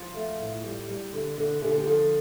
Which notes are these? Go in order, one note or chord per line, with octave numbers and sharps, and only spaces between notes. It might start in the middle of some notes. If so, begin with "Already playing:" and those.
Already playing: F3 F4
A3
A2
G3
G3
D3
D3
D3 G4
A4
G4
F3 A4